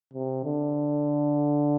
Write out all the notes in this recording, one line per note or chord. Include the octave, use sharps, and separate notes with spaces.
C3
D3